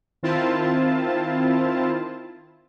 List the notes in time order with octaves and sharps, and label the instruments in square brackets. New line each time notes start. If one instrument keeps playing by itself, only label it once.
[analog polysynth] D#3 C4 E4 F4 A5